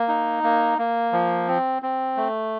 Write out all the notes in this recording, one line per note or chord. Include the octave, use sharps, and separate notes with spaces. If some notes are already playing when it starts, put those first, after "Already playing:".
Already playing: A#3
D#4
A#3
A#3
F3
C4
C4
A3